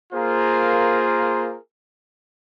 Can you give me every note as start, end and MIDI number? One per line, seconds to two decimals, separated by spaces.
0.13 1.56 58
0.13 1.56 65
0.13 1.56 68
0.13 1.56 70
0.13 1.56 72